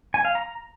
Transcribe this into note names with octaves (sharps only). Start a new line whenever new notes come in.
G#5
F5
A#5